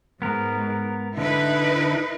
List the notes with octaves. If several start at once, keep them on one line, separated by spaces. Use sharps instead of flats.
G#2 B3 A#4
D3 D#4 E4 B4